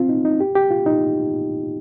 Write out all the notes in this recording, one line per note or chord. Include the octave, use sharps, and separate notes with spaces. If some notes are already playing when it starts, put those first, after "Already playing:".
Already playing: C4 F4
D#4
D#4
G4
G4
F4
D#4